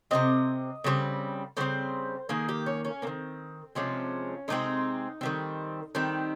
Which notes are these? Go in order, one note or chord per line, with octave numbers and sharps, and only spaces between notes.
C3 F3 C4 D#5
C#3 G3 C4
C#3 G3 C4 C5
D#3 A#3 G#4
G4
C#4
C#4
D#3 A#3 C4
C3 F3 G#3 C4 C#4
C3 F3 G#3 C4 D#4
D#3 G3 C4
D#3 G3 C4